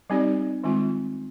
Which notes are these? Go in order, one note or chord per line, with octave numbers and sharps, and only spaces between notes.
G3 C4 D#4 G4 D5
D#3 G#3 C4 F4